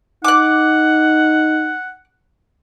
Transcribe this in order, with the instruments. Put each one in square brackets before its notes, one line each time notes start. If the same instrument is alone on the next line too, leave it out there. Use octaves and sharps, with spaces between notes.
[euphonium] D#4 [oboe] F#5 [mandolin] D6 F#6